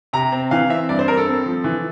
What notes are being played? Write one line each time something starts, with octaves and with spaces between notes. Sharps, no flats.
C3 A#5
C4
E3 F5
C4 E5
G2 D5
C5
G2 A#4
A4
C4
F3
E3